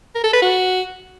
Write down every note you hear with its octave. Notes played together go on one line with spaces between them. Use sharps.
A#4
A4
B4
F#4